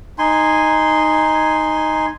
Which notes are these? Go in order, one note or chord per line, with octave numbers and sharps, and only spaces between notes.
D#4 G#5 C6